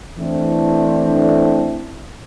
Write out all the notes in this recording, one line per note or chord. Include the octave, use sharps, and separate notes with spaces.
E3 A3 C4 D4